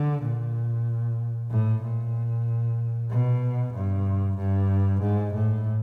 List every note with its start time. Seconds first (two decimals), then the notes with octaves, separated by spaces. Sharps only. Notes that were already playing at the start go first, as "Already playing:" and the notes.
Already playing: D3
0.23 A#2
1.50 A2
1.82 A#2
3.10 B2
3.74 G2
4.37 G2
5.02 G#2
5.34 A2